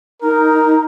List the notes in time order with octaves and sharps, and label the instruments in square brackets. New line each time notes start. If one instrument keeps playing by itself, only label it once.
[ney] D#4 [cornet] A#4